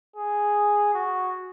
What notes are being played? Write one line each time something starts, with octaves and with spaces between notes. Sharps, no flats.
G#4
F#4